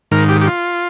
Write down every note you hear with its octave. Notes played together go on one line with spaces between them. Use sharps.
G#2 D#3 A#4
G4
G4
F4